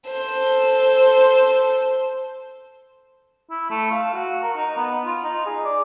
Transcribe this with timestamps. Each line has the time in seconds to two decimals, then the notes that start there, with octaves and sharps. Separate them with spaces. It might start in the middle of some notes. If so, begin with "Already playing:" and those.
0.10 A4 C5
3.51 E4
3.70 A3
3.92 F5
4.14 F#4
4.43 A#4
4.57 D#4
4.77 B3
5.06 F4
5.24 D#4
5.46 G#4
5.64 D5